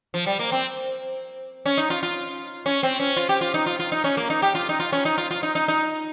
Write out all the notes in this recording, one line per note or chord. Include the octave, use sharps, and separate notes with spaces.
F3
G3
A#3
C4
C#4
D#4
F4
F4
C#4
C4
C#4
F4
G4
F4
D#4
F4
F4
D#4
C#4
A#3
D#4
G4
F4
D#4
F4
C#4
D#4
F4
F4
D#4
D#4
D#4